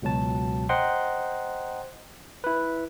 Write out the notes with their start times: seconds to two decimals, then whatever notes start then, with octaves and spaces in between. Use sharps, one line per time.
0.02 C#2 B2 F#3 A5
0.69 C5 D#5 F#5 G5 A#5 C6
2.44 E4 B4